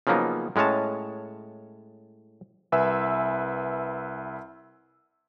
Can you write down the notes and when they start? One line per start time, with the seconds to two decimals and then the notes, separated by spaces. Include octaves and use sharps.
0.07 C#3 F3 F#3 A#3 B3 D#4
0.56 A2 G#3 C#4 C#5 A5
2.72 C2 B4 E5 G#5 E6